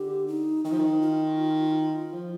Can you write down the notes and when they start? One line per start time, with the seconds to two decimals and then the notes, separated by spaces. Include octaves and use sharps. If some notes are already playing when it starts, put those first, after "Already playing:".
Already playing: D3 G4
0.28 D#4
0.65 D#3 D#4
0.72 F3
0.79 D#3
1.01 F4
2.13 F3